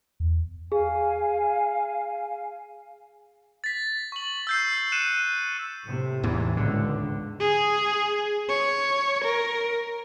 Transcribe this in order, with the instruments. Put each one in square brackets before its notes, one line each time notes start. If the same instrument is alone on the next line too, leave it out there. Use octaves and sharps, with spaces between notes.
[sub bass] E2
[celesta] G#4 [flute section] F5 G#5
[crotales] A6 B6
C#6 F#7
E6 G6 C7
F#6 C#7 D#7 E7
[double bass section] A2 C3
[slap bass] E2 G#2 E3
[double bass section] C#2 G#2 [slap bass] D3
[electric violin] G#4
C#5
A#4